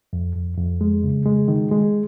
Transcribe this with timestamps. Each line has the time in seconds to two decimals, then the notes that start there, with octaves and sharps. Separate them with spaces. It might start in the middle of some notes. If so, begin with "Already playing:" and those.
0.13 F2
0.35 F2
0.57 F2
0.81 G#3
1.04 C#3
1.26 G#3
1.48 D#3
1.71 G#3